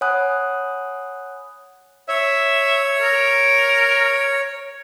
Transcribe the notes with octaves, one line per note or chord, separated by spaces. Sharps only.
C#5 F#5 G#5 B5 D#6 F#6
C#5 E5
A#4